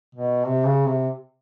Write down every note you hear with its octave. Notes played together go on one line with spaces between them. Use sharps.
B2
C3
C#3
C3